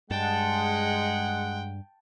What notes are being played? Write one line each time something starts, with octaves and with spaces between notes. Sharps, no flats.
G2 G#3 F#5 G5 A5